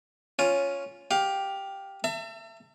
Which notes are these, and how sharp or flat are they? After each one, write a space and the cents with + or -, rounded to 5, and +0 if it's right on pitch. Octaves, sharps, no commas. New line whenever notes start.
C#4 +0 F4 +0
G4 +0 F5 +20
E5 +30 A5 +40